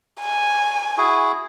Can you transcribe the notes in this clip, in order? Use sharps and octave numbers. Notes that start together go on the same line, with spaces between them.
G#5
E4 F#4 G#4